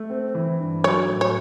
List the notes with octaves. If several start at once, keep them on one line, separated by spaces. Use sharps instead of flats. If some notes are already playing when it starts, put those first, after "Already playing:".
Already playing: A3
C4
E3
G2
F#3 C#5
A2
C#5